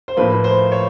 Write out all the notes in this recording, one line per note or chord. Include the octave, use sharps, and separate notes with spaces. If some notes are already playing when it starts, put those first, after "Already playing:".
C5
A2 F3 A#3 B4
C5
C#5